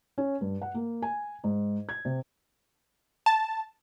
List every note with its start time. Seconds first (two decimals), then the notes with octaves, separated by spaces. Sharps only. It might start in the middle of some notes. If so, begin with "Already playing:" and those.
0.18 C#4
0.41 G2
0.62 F#5
0.75 A#3
1.02 G#5
1.44 G#2
1.89 G#6
2.05 C3
3.26 A5